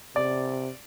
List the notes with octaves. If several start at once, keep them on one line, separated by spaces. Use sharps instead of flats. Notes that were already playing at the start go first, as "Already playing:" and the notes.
C3 D5